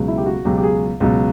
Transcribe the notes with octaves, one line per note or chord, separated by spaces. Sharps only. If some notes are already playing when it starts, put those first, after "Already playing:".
Already playing: C#2 B2 F#3
E4
G4
F#4
C#2 B2 F#3 G4
G4
G#4
C#2 B2 F#3